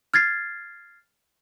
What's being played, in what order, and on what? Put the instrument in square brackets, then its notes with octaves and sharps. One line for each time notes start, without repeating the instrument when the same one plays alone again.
[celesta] F6 G#6 A6 C7